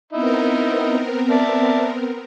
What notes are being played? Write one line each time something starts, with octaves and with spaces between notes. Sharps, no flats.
B3 C4 D#4 E4 A#4
D5 E5 A5